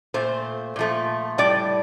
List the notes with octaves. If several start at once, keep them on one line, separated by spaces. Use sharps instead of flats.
A#2 A3 C5
A#2 F3 A3
A2 G3 D5